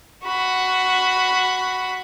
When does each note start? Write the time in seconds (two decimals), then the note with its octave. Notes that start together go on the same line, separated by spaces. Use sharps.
0.25 F#4 B5